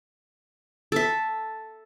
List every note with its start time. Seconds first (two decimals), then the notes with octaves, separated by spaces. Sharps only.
0.92 A4 E5